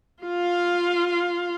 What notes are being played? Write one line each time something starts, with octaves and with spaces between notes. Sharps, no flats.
F4 F5